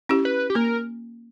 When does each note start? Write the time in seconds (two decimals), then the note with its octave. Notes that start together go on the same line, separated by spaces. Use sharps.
0.09 C#4 E4 G4
0.25 B4
0.50 G4
0.55 A#3 A#4